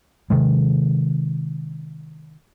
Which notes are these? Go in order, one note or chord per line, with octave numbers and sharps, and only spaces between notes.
C3 D#3 G#3